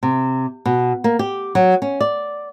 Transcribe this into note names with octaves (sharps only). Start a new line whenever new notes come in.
C3
B2
A#3
G4
F#3
C#4
D5